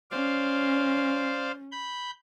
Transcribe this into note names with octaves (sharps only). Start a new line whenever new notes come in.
C#4 C5 D5 F5
B5 G6